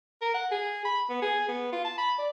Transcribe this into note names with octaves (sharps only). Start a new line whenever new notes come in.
A#4
F#5
G#4
B5
B3
G#4
B3
F4
A5
B5
D5